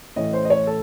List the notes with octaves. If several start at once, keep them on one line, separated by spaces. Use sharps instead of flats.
A2 E3 A3 C#4 D#5
C5
D#5
C#5
A4